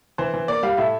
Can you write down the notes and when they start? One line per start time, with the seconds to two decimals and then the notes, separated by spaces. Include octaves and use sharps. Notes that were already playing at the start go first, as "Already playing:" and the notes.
0.18 E3 C5
0.34 E3
0.48 A#3 D5
0.63 G3 F5
0.77 A2 E5